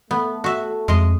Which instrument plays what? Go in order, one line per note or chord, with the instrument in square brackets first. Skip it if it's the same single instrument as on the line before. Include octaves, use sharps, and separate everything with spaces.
[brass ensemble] A3 [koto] B3
[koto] F#4 E5
[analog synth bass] F2 [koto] G#3 D#5